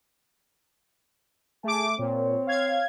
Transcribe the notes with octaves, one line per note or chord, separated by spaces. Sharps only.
A3 G#4 G#5 A5 D6
A#2 C4 C#5
F5 G#6